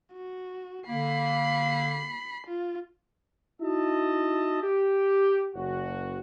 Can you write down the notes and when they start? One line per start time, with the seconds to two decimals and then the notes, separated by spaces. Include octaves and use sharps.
0.13 F#4
0.89 D3 A#3 B5 C7
2.47 F4
3.61 D#4 E4 F#4 D#5 E5 A5
4.62 G4
5.54 F#1 F#4